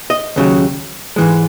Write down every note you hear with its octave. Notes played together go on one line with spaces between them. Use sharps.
D#5
D#2 C#3 F#3
G#2 E3 G#3